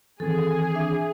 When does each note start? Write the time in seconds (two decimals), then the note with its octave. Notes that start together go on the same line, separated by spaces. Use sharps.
0.20 D#3 E3 C4 G#4 A4
0.74 D4 E5